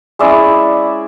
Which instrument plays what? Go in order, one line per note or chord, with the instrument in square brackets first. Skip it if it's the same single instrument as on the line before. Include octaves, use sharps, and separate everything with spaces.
[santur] G#3 C#4 E4 D5 E5